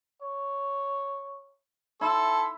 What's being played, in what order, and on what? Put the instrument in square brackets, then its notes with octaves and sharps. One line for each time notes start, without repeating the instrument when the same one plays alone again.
[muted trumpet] C#5
[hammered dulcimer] E4 [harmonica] A4 [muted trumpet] C6